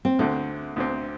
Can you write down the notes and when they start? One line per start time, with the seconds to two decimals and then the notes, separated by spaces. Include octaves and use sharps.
0.05 C4
0.19 D2 D3 A3 C4
0.76 D2 D3 C4